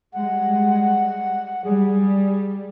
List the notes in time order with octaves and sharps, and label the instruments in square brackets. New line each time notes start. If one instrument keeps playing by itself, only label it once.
[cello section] G3 G#3 [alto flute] F#5
[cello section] G3 [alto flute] G#4